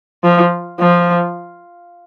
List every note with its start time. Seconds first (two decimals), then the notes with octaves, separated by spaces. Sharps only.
0.24 F3
0.80 F3